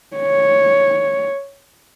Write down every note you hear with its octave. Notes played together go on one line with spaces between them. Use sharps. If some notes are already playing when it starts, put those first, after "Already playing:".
C#5